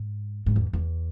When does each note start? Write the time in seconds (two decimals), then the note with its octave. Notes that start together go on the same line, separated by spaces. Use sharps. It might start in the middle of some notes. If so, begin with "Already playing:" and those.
Already playing: G#2
0.46 G#2
0.56 E2
0.73 E2